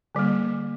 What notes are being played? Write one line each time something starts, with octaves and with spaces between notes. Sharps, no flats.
D3 G3 A#3